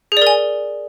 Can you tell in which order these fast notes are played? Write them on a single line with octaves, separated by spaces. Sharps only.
G#4 D5 A#4 G#5